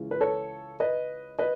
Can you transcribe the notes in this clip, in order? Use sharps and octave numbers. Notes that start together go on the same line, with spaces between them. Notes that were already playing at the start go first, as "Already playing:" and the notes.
Already playing: C#2 C#3 E3
B4
A4 C#5
B4 D#5
B4 D#5